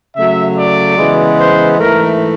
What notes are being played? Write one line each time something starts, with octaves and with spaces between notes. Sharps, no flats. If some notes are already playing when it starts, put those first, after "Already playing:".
C#3 F#3 A3 E5
D5
C#3 E3 G#3 B3
C5
G#2 E3 A3 A#4